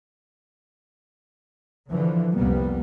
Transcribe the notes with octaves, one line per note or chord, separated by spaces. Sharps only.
D3 E3 F3
C2 F2 G3 A#3 B3